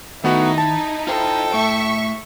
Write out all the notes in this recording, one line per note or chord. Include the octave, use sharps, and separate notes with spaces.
D#3 A3 B3 D#4 E4 F#4
A5
F4 A4 C5 G5
A2 E5 C#6